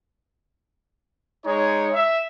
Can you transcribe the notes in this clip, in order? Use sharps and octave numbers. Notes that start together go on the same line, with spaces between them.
G#3 D#4 C#5
E5